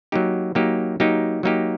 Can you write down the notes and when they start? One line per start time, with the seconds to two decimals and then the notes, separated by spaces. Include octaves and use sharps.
0.12 F#3 A#3 D#4 G4
0.55 F#3 A#3 D#4 G4
1.00 F#3 A#3 D#4 G4
1.43 F#3 A#3 D#4 G4